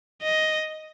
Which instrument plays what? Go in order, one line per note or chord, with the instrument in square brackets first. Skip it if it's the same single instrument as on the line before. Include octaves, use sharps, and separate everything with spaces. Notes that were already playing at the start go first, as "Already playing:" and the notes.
[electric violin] D#5